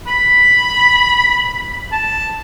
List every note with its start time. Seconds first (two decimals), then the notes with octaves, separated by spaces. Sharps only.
0.07 B5
1.92 A5